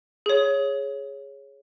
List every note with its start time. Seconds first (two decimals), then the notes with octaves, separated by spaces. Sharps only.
0.26 G#4 C#5